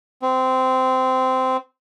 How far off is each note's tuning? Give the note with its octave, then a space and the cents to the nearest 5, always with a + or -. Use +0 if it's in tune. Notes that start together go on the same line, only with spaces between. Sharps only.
C4 -15